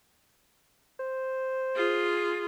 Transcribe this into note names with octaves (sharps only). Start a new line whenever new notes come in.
C5
F4 G#4